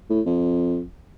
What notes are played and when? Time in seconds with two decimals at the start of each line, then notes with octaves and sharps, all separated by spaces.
0.10 A2
0.26 F2